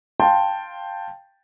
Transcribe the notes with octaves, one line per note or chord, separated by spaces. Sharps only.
F5 G5 A5 C6